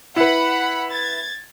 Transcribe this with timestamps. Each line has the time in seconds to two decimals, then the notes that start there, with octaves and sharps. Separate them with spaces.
0.16 E4 B4 F#5 B5
0.91 G#6 A6